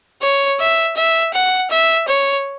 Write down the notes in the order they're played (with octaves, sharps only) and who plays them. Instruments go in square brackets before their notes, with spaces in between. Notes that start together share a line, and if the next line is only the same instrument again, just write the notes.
[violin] C#5
E5
E5
F#5
E5
C#5